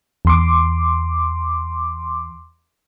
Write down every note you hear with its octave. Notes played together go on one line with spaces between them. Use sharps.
E2 C6 D6